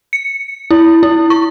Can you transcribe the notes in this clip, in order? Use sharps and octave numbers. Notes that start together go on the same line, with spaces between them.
C#7
E4
E4
C#6